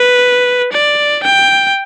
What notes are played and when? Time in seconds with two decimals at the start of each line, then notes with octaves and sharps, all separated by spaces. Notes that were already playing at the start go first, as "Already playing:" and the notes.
Already playing: B4
0.73 D5
1.24 G5